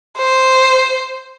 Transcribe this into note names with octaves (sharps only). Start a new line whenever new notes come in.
C5